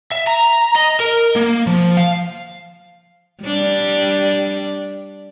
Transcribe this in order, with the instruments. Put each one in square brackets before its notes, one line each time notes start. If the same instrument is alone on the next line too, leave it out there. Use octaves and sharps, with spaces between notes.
[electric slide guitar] E5
A#5
D#5
A#4
A#3
F3
F5
[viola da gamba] G3 D4